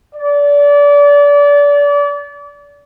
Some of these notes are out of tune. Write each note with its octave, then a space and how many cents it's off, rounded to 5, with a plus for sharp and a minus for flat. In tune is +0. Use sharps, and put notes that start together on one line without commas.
D5 -30